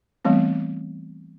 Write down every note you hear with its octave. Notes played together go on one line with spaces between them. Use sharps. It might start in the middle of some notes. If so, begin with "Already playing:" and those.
E3 G3 A3 B3 C4